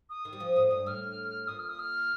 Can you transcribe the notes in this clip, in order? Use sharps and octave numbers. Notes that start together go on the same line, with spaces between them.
D#6
D#3
G3
F3
A2
G2
A2 F6
A#2 D#6
F6
D#6
F6